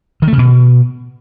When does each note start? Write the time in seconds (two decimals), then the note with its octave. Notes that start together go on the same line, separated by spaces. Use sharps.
0.22 D#3
0.27 A3
0.33 C#3
0.38 B2